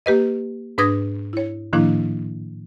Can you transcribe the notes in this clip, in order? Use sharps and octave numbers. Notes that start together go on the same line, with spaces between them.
A#3 G4 B4 D#5
G#2 D4 B4 D#6 G#6 A#6
E4 C#5
A2 D#3 F3 A#3 D4 E4